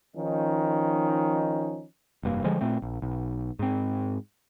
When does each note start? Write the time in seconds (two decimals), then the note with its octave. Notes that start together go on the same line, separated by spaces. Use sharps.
0.16 D#3 F3 C#4 D#4
2.23 F1 G2 A#3
2.44 D3 F3 G3 G#3
2.61 A#2 A3 C4
2.82 A#1
3.02 B1
3.59 G#2 C4